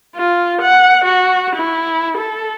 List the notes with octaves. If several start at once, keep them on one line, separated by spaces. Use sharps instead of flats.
F4
F#5
F#4
E4
A4